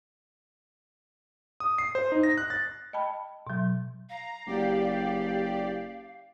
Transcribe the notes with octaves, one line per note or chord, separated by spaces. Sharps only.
D#6
C7
C5
D#4
A#6
F#6
A6
D#5 G5 A5 B5
B2 F#3
F5 A#5
F#1 G4 D5